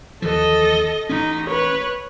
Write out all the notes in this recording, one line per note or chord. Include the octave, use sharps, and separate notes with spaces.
D#2 E3 F3 A4 D#5
A1 C#4 D#4
B4 C#5